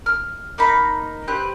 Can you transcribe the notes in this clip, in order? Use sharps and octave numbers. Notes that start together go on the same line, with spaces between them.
F6
A#3 D#4 A#5 B5
C4 G4 B4 F#6